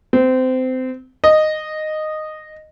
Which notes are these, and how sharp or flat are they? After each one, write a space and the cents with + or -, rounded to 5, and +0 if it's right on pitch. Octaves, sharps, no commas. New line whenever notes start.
C4 -25
D#5 -10